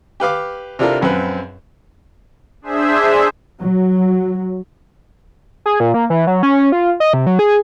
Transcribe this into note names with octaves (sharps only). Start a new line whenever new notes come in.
G4 B4 F5 D6
C3 D4 E4 F4 A4 A#4
A#1 F#2 C4 B4
D4 G#4 C5 E5
F#3
G#4
A#2
A#3
E3
F#3
C#4
F4
D#5
C3
F#3
G#4